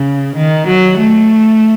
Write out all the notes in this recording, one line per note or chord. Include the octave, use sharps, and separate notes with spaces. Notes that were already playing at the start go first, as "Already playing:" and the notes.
Already playing: C#3
D#3
F#3
A3